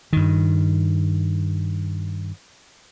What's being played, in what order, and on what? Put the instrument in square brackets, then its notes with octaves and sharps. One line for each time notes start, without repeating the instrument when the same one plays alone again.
[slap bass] G2 D#3